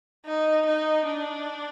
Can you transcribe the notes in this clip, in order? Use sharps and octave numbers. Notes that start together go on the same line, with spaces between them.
D#4
D#4
D4